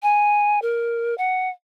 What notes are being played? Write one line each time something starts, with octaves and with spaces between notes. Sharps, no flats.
G#5
A#4
F#5